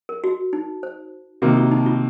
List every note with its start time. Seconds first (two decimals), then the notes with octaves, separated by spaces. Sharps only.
0.09 A#4
0.24 F#4
0.53 D#4
0.83 C5
1.42 C3 D#3 A#3 F#4
1.57 F4
1.72 D#4
1.86 F4